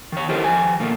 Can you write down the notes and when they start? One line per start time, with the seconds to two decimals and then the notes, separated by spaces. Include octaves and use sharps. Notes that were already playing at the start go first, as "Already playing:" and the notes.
0.12 D#3 C#5
0.29 E4 G4 A4 A#4 C5 D#5
0.44 F2 D#3 G#5
0.80 B2 A3 A#3